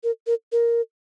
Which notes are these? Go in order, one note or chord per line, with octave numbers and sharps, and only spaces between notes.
A#4
A#4
A#4